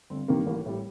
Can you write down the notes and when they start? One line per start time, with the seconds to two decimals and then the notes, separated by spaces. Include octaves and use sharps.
0.10 G1 C4
0.28 G2 D#3 G3 A#3
0.47 A1
0.66 A2 G3